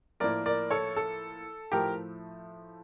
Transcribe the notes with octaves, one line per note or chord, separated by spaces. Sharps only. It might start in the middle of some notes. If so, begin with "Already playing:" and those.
A2 F3 A#3 A#4 D5
A#4 D5
A4 C#5
A4
A2 F3 A3 G4 A#4